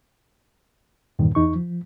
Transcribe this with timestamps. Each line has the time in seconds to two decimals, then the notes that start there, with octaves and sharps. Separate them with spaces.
1.19 E2 G2 A#2 D#3
1.35 E2 D#4 C#6
1.56 F3